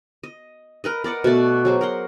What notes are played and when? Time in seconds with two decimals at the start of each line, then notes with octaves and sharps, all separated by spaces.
0.23 D#5
0.84 A#4 B4 D#5
1.04 A#4 D5 D#5 F#5
1.24 B2 A3 D5
1.65 F#3 G#4 C5
1.81 A#4 F#5 C6